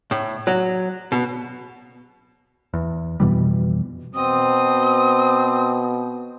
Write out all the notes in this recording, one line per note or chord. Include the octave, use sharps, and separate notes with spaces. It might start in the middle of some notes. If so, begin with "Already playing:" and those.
A2
F#3
B2
E2
F2 B2 E3 G3
B2 C4 D#6